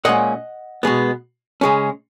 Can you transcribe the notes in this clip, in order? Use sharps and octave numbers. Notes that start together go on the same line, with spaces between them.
A#2 G#3 C#4 D#5 F#5
B2 G#3 B3
C#3 G#3 C#4